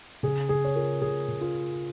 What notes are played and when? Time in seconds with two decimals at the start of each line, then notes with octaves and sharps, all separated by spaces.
0.23 C#3 G#4
0.49 C#3 G#4
0.65 C#5
0.76 F4 A#4
1.02 C#3 G#4
1.28 C#3
1.41 F4